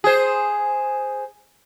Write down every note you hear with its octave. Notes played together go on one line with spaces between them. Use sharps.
G#4 C5